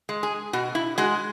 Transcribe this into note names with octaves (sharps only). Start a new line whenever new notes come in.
G#3
G#4
B2 F#4
E4
G#3 F#4